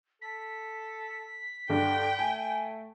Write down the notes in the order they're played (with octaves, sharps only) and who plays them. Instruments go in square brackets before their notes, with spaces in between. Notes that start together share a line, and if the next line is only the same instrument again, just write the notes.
[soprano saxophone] A4 [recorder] B6
[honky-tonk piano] G2 D3 [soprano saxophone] D4 [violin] G5
[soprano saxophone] A3 [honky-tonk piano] G#5